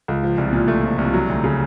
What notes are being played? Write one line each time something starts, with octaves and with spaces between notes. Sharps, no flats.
C#2
F3
C2
A#2
A3
F3
C2
F#3
D2
C#3